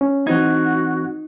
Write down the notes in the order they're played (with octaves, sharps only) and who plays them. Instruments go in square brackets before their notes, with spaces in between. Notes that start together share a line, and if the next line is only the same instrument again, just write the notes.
[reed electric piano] C#4
[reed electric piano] E3 C4 G#6 [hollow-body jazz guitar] D#4 [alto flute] F#4